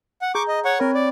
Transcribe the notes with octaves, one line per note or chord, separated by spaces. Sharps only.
F#5
G#4 A#5 C#6 D6 G6
D#5
C#5 F#5 C#6
C4 A#4 C#5 B5
D5